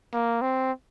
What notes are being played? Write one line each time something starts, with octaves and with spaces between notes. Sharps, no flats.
A#3
C4